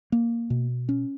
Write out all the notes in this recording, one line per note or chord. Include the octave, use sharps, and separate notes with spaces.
A#3
B2
C#4